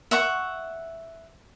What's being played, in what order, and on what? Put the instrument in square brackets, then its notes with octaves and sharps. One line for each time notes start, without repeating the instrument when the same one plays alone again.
[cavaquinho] E5 F#5 C#6